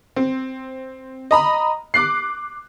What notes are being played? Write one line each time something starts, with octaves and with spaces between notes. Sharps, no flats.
C4
D#5 A#5 B5
D6 F#6 C7